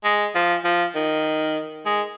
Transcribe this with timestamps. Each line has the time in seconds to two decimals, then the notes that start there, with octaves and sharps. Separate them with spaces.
0.04 G#3
0.35 F3
0.64 F3
0.95 D#3
1.86 G#3